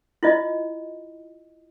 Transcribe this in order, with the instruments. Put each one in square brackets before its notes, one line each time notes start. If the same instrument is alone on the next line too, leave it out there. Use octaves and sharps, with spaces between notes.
[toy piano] E4 F4 D#5